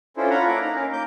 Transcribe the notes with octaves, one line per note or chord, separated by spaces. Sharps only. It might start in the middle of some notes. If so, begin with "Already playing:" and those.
C#4 D4 E4 F4 A4 C5
F4 C#5 F5 F#5 A#5 B5
A#3 E4 D6
D#4 F5 A#5
C#4 A#4
A#3 D6 G6